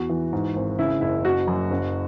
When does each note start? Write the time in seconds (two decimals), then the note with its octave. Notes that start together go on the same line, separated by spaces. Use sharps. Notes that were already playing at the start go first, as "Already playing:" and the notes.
Already playing: E2 F#4
0.09 E3
0.33 G#2
0.56 G#1
0.79 C#3 E4
1.01 F#1 E4
1.25 F#1 F#4
1.47 F#2
1.70 F#1